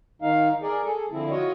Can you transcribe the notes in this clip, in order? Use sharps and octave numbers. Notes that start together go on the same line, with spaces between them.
D#3 D#4 F5
G#4 A#4 D5
G#4 A4
D3 F3 C4 E4
F4 F#4 C#5 D#5